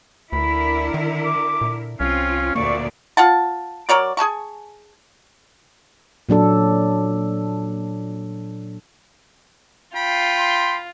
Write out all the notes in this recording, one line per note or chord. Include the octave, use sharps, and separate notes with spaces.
D2 D3 E4 A#4 B5
D#3
D6
A#2
C2 C4 C#4 F4
D2 A#2 A#3 D5 C#6
F4 F#5 A5
F#3 A#4 C#5 D5
G#4 G#5 A5 C#6
A#2 F#3 D4 A4
F4 G5 B5
C6